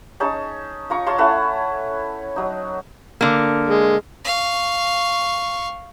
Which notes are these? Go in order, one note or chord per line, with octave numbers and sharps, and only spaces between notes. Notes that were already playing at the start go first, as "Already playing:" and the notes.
C#4 D#4 G#4 A5
F4 A#5 C#6
C#5 F5 A5 C6
A3 C#4 E4 F#5
F#3 D#4
D3 A#3
G#3
F5 C#6